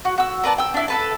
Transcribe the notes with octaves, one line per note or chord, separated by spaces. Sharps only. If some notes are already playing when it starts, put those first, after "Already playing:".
F#4
F#4 E6
A#4 B4 D5 A5
G5 E6
D4 E4
A4 B4 A5